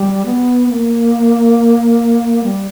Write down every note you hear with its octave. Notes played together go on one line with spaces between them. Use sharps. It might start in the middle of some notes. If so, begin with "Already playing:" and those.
Already playing: G3
B3
A#3
G3